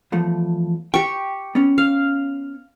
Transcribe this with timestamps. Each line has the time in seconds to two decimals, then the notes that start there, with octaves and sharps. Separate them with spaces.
0.12 E2 F3 A3
0.94 G4 G5 C#6
1.55 B3 C#4
1.78 F5